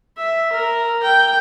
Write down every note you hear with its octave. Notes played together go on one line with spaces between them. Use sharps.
E5
A#4
G5